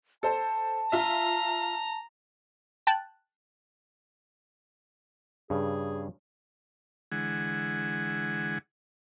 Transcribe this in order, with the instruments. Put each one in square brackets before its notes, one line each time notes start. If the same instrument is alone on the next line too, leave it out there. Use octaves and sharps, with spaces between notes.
[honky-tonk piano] A4 C5 [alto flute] A5
[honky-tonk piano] F4 E5 [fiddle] A#5
[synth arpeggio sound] G5 A5 F#6
[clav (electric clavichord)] G2 C#3 [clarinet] G#4
[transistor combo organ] D3 E3 G#3 F#5 G#5